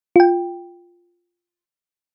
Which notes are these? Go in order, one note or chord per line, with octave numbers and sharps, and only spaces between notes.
F4 G5